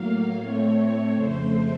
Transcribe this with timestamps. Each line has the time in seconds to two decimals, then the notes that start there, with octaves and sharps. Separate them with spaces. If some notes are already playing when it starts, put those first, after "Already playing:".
Already playing: A2 F#3 A#3 F5
0.38 A2 A3 C4 C#5
1.13 F2 C#3 A3 C5